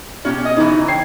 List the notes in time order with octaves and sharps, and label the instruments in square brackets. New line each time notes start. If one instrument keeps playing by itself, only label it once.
[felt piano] B2 [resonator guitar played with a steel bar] C#4 F#4 G4
[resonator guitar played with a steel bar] D#5
[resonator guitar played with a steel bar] C#3 E3 [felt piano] D#4
[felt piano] G5 G#6 C7